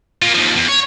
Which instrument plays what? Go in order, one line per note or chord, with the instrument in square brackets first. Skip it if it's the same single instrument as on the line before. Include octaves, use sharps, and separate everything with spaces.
[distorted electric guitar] A#3 F4
D#2 F3
E2
C#5